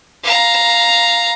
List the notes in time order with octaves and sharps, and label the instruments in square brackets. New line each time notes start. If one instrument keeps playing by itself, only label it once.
[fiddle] F5 A#5